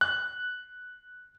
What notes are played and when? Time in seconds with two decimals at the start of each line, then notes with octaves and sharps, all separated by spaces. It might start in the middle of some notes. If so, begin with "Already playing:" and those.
0.01 F#6